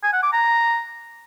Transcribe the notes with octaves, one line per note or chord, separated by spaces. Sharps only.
G#5
F#5
D6
A#5